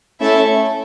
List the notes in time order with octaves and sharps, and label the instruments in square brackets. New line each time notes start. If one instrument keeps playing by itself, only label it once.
[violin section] A3 C#4 E4 A4 E5